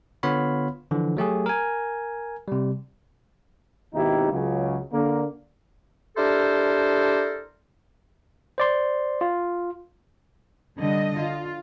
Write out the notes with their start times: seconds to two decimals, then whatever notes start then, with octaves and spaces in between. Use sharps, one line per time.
0.23 D3 B3 F4 C#5 F5 B5
0.91 D3 E3 F3
1.17 F#3 A3 G4 G#4
1.46 A#4 G#5
2.48 C3 G3
3.94 G#1 D#2 B2 D#4 E4 G4
4.32 C#2 C#3 F#3
4.93 D3 A#3
6.17 D4 E4 G4 A4 A#4 C5
8.58 C5 D5 C6
9.21 F4
10.78 D3 G3 D#5
11.20 F4